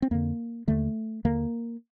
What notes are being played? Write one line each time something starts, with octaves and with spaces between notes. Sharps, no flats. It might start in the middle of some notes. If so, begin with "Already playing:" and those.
C4
F2 D3 A#3
D#2 D3 A3
D#2 D3 A#3